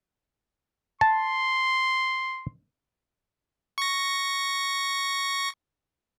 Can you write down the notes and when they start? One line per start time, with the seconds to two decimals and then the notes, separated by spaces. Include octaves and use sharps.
1.01 A5 C6
3.78 C#6 A#6